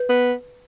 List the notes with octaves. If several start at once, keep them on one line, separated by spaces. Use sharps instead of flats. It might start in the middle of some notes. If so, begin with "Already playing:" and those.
Already playing: B4
B3